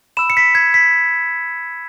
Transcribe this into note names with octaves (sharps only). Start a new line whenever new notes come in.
B5 E6 E7
C#7
B6
G#6
B6